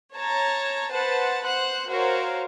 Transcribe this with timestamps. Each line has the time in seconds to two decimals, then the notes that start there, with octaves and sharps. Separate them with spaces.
0.15 C#5 A5 A#5
0.90 B4 C5 F#5 A5
1.44 C5 F#5 F#6
1.89 F#4 A#4 C5 C#5 F5